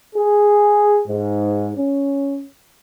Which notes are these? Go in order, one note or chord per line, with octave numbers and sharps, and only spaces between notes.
G#4
G#2
C#4